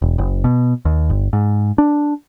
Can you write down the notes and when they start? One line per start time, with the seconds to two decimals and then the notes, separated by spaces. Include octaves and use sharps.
0.02 E1
0.18 F#1
0.44 B2
0.85 D#2
1.10 G1
1.33 G#2
1.78 D4